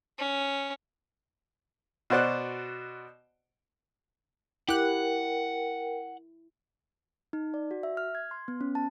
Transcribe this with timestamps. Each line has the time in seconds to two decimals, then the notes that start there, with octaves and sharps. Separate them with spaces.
0.18 C#4
2.10 B2 F#4 C5 D5 F#6
4.69 E4 G4 A#4 F#5 G5 F#6
7.33 D#4
7.54 D5
7.71 F#4
7.83 E5
7.97 F6
8.15 G#6
8.31 C6
8.48 B3
8.61 C#4
8.75 A5